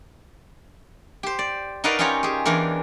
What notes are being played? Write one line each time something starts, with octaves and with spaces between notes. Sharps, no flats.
G4 C5
D5
D#4 F#4 A#4 B4 D5 F5
C#4 D#4 F4 G4 C#5 A#5
G4 G#4
E2 E3 D4 A#4